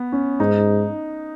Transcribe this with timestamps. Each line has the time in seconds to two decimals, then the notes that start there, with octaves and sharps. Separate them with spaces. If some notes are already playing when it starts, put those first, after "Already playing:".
Already playing: B3
0.12 C#4
0.40 G#2 D#4